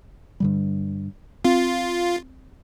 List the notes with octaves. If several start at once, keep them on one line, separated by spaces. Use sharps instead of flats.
G2 D3 G3
C4 F4